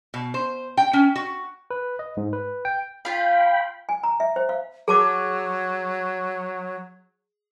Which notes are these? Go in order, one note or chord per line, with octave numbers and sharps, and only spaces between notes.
B2
C5
G5
C#4
F#4
B4
D#5
G#2
B4
G5
F4 F5 G5 B5
G#5
A#5
E5
C5
F5
F#3 G#4 A5 D6